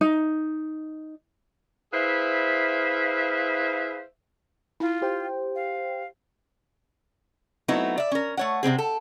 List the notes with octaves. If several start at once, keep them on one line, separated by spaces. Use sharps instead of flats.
D#4
E4 G#4 B4 C5 E5 F5
E4 F4
G4 C5 G5
F5
F#3 A3 B3 C4 D#4 E4
D5 E5
C#4 A#4
A3 C#5 F#5
C3 D#3 C4 G#4
A4